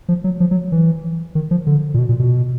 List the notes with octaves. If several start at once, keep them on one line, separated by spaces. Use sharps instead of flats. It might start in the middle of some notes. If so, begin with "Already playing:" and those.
F3
F#3
F3
F#3
E3
D#3
F3
D3
A#2
B2
A#2
B2